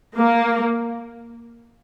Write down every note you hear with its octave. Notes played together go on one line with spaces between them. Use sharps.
A#3